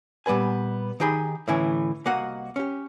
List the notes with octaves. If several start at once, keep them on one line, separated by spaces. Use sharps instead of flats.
A#2 G3 B3 B4 G#5
D#3 D#4 G4 G#4 B5
A2 D3 E3 C#4 G#5
C2 A#3 F#4 D#5 F#5
C#4 G4